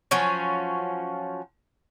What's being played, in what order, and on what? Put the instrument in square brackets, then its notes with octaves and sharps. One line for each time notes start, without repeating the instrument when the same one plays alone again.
[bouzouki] F3 F#3 C#4